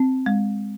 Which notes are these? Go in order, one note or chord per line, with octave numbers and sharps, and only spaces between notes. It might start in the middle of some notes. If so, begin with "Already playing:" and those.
Already playing: C4
G#3